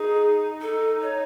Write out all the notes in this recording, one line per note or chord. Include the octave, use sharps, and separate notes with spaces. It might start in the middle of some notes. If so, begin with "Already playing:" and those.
Already playing: D#4 G#4
D#4 A4
C#5